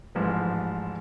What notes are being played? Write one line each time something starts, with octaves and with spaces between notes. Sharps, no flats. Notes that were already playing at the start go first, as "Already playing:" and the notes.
A1 G#2 F3 B4